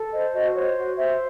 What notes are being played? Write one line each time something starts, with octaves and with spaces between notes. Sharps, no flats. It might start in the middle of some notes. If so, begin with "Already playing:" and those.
Already playing: A4
C5 D#5
F#4 D#5
C5 C#5
F#4
C5 E5